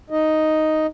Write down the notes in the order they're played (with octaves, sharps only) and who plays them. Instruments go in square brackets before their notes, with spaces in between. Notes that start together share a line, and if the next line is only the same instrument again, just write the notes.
[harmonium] D#4 D#5